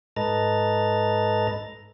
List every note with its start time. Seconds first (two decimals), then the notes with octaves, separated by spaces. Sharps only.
0.16 G#2 A4 B4 D#5 A#5 A6